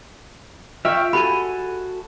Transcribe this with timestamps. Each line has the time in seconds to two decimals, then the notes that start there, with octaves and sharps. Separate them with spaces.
0.85 F4 E5 F5 G5 C#6
1.13 F#4 G4 A4 G#5 B5 D#7